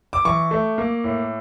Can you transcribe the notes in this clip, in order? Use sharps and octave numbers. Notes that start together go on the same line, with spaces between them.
D6
E3 C#6
A3
A#3
A2